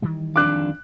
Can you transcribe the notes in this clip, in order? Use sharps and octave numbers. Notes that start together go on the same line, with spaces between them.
D#3 E3 G3
F2 D4 F5 D6 F#6